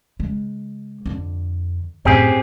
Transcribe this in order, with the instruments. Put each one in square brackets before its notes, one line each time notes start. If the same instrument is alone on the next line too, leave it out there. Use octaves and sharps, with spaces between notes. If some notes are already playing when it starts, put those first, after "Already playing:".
[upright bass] C#3 G#3
F2 D3
[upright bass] F#2 A2 [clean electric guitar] C4 G4 G#4